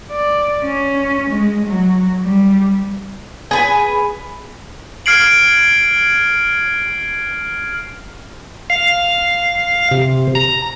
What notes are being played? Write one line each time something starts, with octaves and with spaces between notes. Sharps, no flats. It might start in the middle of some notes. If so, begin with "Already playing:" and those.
D5
C#4
G#3
F#3
G3
G#4 B4 G#5
F6 G#6 C7 D7 F#7
F5
C3
A#5